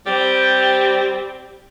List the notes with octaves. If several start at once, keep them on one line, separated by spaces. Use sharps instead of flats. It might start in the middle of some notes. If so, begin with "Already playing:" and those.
G3 C4 G4